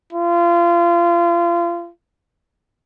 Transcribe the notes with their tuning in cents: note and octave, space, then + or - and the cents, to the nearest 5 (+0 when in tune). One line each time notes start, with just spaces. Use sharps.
F4 -30